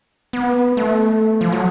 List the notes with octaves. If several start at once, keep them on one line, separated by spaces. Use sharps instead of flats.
B3
A3
F3
F#3